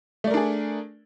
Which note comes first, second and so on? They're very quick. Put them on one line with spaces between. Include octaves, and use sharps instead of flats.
A3 D5 A#4 D4 G#4